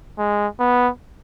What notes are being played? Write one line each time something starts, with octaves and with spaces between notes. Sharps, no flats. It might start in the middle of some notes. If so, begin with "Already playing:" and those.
G#3
B3